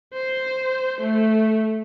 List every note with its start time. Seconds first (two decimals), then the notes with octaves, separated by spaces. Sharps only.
0.13 C5
1.01 A3